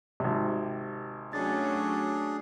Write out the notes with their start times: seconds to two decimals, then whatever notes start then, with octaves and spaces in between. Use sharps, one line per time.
0.20 G#1 C3 G4
1.33 F#3 A3 C#4 D4 G#4 A6